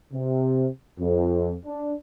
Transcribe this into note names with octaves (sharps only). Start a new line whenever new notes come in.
C3
F2
D4